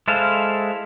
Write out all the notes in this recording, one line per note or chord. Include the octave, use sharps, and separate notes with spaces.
G#3 E4 A4 C5 F5